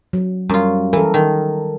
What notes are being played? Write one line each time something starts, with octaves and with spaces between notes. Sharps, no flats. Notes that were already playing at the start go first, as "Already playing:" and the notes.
F#3
F#2 G3 F4
E3 A4 A#4
D#3